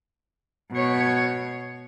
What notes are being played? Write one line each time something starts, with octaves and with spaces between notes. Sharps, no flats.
B2 C#5